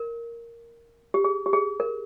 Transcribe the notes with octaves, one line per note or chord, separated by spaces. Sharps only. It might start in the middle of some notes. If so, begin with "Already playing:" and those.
Already playing: A#4
G4
G#4
G4
G#4
A#4